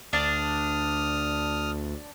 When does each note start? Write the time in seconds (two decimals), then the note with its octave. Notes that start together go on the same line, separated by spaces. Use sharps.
0.13 D2 D4 A5 D#6 F6